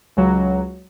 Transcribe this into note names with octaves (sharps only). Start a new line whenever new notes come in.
C#2 F#3